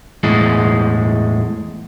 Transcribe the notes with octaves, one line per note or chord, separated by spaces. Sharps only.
E2 A2 G#3